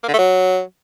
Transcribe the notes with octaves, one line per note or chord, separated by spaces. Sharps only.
A#3
D3
A3
F#3